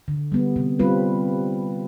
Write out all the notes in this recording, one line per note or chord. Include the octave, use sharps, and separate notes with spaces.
D3
G3 B3
C3
G3 C4 F4 B4